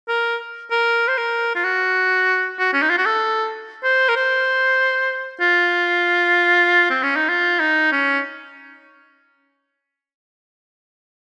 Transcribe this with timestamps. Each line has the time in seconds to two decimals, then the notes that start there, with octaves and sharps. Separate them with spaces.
0.08 A#4
0.71 A#4
1.08 C5
1.17 A#4
1.55 F4
1.64 F#4
2.59 F#4
2.73 C#4
2.82 D#4
2.90 F4
2.98 F#4
3.06 A4
3.84 C5
4.09 A#4
4.16 C5
5.40 F4
6.90 C4
7.03 C#4
7.16 D#4
7.29 F4
7.59 D#4
7.92 C#4